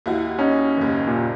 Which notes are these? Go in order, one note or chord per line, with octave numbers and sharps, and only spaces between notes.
D#2 E4 F#4
C#4 D#4
F#1 D#2
A#2